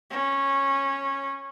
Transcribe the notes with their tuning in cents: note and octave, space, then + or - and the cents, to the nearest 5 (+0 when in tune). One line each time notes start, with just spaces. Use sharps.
C#4 -15